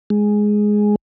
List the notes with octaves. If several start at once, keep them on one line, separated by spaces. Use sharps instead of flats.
G#3